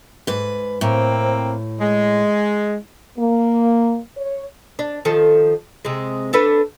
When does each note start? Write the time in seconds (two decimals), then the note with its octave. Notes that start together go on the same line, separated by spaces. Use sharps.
0.27 G#2 B4
0.81 A2 A#3 C4
1.79 G#3
3.18 A#3
4.17 C#5
4.79 D4
5.05 D#3 F3 A4
5.85 C3 G#3
6.33 D4 A4 B4